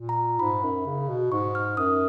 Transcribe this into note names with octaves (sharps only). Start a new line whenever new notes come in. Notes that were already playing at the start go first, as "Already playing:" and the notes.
Already playing: A#2
A#5
G#2 B5
F#2
C#3
B2
G#2 C#6
F6
F#2 D#6